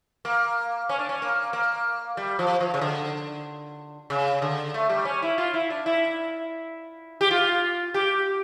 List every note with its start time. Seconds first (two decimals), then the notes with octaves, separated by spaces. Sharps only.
0.25 A#3
0.89 C#4
0.99 D4
1.09 C#4
1.22 A#3
1.53 A#3
2.17 G3
2.39 F3
2.61 F3
2.74 C#3
2.81 D3
4.10 C#3
4.42 D3
4.74 A3
4.89 G3
5.05 C#4
5.22 E4
5.38 F4
5.54 E4
5.70 D4
5.86 E4
7.21 G4
7.31 F4
7.94 G4